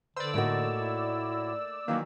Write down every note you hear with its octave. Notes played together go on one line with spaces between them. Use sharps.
D3 B4 C5 D5 E6
A2 A3 A#3 D#4 F#4
E4
D#3 E3 F#3 A#3